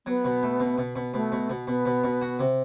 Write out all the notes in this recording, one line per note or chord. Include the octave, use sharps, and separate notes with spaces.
F#3 B3
B2
A3
B2
B2
B2
B2 A3
B2
B2
B2 B3
B2
B2
F#4
C3